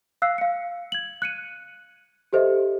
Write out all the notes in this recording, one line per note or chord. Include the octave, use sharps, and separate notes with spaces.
F5 E6 F#6 C7
F5 C#7
G#6 F#7
F#6 C#7 D#7
G4 A4 C5 D#5 E5